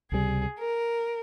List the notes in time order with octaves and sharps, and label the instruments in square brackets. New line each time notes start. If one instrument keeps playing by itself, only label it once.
[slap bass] C#2 C3 G3 [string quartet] G#4
[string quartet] A#4